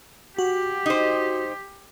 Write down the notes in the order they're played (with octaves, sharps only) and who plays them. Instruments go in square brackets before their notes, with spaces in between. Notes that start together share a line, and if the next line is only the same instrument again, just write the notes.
[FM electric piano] F#4 [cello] G4
[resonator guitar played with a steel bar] D#4 C5